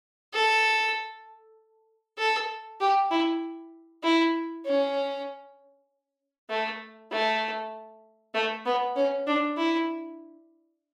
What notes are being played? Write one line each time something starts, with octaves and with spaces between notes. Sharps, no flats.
A4
A4
G4
E4
E4
C#4
A3
A3
A3
B3
C#4
D4
E4